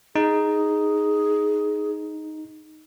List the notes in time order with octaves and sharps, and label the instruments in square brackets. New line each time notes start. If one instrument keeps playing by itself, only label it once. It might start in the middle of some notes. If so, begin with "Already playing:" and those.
[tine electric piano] D#4 [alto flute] G#4